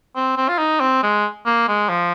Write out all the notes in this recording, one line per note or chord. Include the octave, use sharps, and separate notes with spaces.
C4
C4
F4
D#4
C4
G#3
A#3
G#3
F3